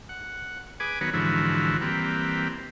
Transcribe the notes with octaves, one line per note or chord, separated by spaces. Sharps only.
F#5
G#4 B4 G#5 D6
D#3 F#3 B3 B4 C#5
G#2 D3 E3 F3 E4 F#4
E3 G3 A#3 C4 B4